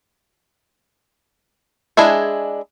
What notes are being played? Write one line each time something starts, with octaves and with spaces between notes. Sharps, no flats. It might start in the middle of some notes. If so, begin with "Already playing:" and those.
G#3 D4 E4 G#4